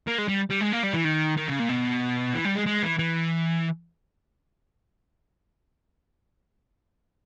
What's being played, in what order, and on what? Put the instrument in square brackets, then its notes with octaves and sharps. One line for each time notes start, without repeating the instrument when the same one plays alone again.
[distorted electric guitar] A#3
G#3
G3
G3
G#3
A#3
G3
E3
D#3
D#3
C#3
A#2
B2
E3
G3
G#3
G#3
E3
E3